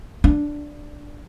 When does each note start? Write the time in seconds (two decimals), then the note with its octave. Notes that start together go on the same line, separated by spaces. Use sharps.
0.24 D4